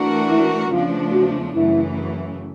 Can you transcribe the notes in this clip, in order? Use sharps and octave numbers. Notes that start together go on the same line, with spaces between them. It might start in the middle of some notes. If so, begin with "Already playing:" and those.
Already playing: E3 A3 D4 F#4 A#4
E4
E2 C#3 F3 A3 D4 F4
F#4
F#2 C#3 E3 A3 E4